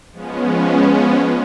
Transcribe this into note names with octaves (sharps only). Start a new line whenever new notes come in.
F3 G#3 B3 C#4